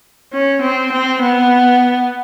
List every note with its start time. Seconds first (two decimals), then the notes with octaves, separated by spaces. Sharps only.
0.33 C#4
0.62 C4
0.92 C4
1.22 B3